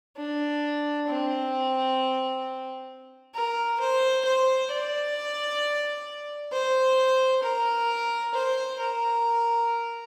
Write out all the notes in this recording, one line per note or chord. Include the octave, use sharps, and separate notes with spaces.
D4
C4
A#4
C5
C5
D5
C5
A#4
C5
A#4